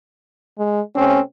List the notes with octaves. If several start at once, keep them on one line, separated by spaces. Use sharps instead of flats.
G#3
C3 A3 C4 C#4